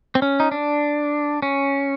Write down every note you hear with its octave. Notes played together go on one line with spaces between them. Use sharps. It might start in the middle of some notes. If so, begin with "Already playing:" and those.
C4
C#4
D#4
D4
C#4